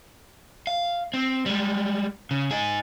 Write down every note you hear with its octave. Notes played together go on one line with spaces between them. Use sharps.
F5
C4
G3 G#3
C#3
D#4 G#4